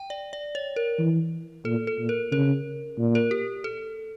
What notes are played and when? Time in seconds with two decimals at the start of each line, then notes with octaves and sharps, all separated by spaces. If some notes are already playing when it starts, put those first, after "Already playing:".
Already playing: G5
0.10 D5
0.33 D5
0.55 C#5
0.76 A#4
0.99 E3
1.65 A#2 A4
1.87 A4
1.99 A#2
2.09 A#4
2.32 C#3 A#4
2.98 A#2
3.15 A#4
3.31 G4
3.64 A4